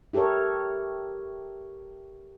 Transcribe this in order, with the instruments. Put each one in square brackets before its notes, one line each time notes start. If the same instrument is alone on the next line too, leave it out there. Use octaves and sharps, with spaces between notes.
[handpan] E4 G4 A4 A#4 C#5